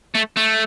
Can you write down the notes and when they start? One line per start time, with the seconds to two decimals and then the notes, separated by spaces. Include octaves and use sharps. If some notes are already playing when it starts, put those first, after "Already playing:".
0.15 A3
0.37 A3